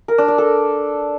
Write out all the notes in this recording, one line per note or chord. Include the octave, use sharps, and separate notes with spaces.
A#4
D4
D5
A4